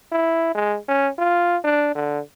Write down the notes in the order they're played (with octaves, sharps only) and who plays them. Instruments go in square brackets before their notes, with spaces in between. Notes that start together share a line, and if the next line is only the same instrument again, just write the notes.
[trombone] E4
G#3
C#4
F4
D4
D3